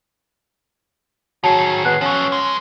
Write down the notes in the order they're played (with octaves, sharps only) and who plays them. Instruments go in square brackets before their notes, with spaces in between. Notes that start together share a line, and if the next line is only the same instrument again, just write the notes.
[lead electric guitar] D#3 G#4 [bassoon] F#3 [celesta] A5
[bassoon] B3 [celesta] F#6 C7
[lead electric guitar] F3 F#3 [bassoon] C#4
[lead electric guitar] G#3